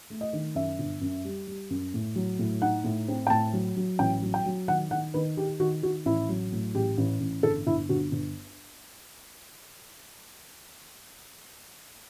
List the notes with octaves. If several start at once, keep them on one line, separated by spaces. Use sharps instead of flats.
A3
D#5
D#3
F#2 E5
G1
F#2
G3
G3
F#2
A2
F#3
A2
D#4 F#5
A2
C4
G5
A2 A5
F#3
F#3
A1 G5
F#3
G5
F#3
D#3 F#5
D#3 F#5
D#3 B4
D#3 G4
D#3 F#4
D#3 F#4
A1 E4
F#3
A2
A1 G4
A1
A1
G1 A4
G1 E4
G1 F#4
G1